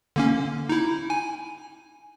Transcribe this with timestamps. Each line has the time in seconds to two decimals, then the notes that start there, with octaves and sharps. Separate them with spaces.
0.16 D3 A#3 C#4
0.69 D#4 E4
1.10 G#5